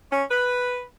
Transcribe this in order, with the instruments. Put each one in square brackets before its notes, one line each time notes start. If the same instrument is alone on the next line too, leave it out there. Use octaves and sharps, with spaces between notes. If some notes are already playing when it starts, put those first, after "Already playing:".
[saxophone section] C#4
B4